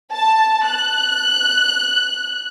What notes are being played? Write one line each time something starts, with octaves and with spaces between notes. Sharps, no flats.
A5
F#6